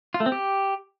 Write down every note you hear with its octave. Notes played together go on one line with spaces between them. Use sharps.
F4
A3
C4
G4